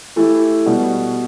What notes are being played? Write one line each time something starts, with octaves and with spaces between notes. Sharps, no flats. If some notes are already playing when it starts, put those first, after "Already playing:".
E3 A3 E4 G4
B2 G3 B3 F#4